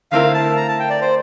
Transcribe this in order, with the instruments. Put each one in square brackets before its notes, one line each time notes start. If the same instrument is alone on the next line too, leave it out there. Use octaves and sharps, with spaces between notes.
[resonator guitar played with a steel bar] D3 A3 C4 E4 A#4 [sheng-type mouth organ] F5
[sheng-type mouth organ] A5
A#5
A5
G5
D5
C5